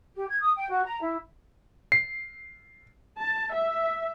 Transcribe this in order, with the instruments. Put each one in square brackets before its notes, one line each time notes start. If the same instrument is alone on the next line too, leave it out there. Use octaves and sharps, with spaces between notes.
[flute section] G4
G#6
D#6
G5
F#4
A#5
E4
[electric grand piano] C7
[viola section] A5
E5